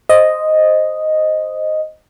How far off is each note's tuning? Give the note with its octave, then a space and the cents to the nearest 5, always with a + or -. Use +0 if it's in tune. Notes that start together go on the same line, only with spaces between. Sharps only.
C5 +0 D#5 +0